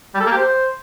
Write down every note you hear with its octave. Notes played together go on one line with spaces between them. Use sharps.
G3
A4
A#3
G4
C5